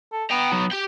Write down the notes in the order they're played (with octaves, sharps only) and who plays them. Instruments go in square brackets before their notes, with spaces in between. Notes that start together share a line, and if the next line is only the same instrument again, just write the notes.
[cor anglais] A4
[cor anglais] B3 [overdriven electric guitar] G5 A#5
[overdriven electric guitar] F#3 D#4
G4 G5